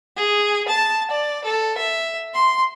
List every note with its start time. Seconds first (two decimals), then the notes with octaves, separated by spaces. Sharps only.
0.16 G#4
0.68 A5
1.11 D5
1.44 A4
1.77 E5
2.34 C6